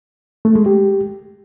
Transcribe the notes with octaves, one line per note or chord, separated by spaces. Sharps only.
A3
G#3
G4